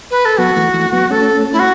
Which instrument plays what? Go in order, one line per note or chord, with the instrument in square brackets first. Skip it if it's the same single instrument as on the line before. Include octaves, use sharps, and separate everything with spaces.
[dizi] B4
A4
[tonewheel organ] F#3 B3 [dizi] F#4
[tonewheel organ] E3 A3
E3 A3
F#3 B3
[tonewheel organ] A3 C#4 [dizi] A4
[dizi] E4
F#4